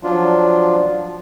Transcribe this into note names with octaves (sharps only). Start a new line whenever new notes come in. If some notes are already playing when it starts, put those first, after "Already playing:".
F3 F#3 D4 F4